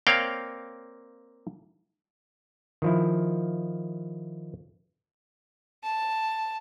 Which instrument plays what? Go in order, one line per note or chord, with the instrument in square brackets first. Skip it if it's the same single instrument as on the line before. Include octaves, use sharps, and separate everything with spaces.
[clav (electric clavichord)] A#3 C4 C#5 D5 F5 G5
D#3 F3 E4
[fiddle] A5